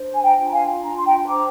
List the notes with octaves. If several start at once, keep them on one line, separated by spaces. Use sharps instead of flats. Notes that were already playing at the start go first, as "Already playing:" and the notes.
Already playing: D4 C5
G#5
G5 A#5
F4
A#5
F5 G#5
D4 A#5
C6
G5 A#5
C5 A#5 D6